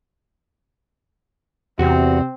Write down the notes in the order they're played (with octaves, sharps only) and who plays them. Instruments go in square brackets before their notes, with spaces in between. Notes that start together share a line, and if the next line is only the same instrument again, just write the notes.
[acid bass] E2 [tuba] C3 [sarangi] C4 [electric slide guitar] F#4